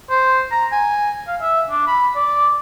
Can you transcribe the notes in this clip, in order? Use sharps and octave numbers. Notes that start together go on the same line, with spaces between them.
C5
A#5
G#5
F5
E5
D4
B5
D5